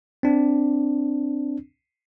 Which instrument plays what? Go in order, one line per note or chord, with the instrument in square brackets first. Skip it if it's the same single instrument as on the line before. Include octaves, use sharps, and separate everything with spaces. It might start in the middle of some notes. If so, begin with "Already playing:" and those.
[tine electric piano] C4 D4